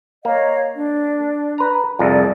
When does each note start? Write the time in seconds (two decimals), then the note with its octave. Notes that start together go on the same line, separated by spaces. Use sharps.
0.25 A#3 C#5 D#5 F5
0.75 D4
1.58 B4 A#5
1.99 C2 F2 G#4 D5